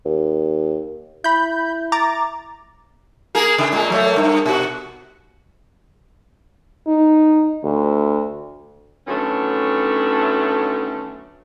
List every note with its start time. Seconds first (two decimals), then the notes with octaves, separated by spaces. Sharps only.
0.05 D#2
1.24 E4 B5 G6
1.92 A#5 D6 A6
3.35 A#3 G#4 A#4
3.58 C#3
3.72 A#2 G#3 A#3
3.90 F#3 A3 A#3
4.16 G2
4.46 B2 F#4
6.87 D#4
7.64 D2
9.06 D3 D#3 F#3 A3 B3 C#4